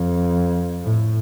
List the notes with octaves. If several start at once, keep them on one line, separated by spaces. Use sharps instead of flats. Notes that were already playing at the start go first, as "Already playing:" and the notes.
Already playing: F2
A2